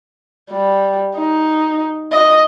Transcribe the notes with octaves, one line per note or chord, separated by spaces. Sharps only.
G3
D#4
D#5